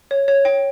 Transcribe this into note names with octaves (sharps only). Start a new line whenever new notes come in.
C#5
C#5
G5